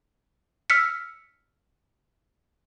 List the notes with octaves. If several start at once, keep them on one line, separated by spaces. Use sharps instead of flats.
E6 F6 B6 C#7